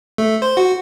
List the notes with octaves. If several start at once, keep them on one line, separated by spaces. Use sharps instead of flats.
A3
C5
F#4